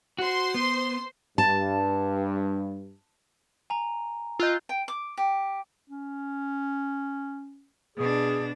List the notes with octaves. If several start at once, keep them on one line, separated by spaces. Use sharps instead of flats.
F#4 C5 C6
B3
G2 A5
G#5 A#5
F4 D#5 E6 F#6 G6
G5
D6
G4
C#4
B2 D4 G#4